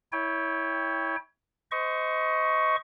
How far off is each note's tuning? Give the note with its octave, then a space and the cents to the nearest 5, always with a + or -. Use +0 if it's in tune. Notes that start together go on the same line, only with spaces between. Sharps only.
E4 -15 C#5 +10 G5 +20
C5 -25 D#5 +20 C#6 +0